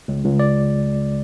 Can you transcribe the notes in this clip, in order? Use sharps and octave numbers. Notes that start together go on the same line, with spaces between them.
C#2
C#2
D5